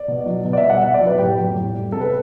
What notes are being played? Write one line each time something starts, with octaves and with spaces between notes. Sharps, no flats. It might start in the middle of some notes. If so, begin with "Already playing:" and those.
Already playing: D5
B2
F#3
B2
D5
E5
G3
F#5
B2 E5
D5
F#3
B4
A2 G4
F#3
A2
G3
C3 A4
B4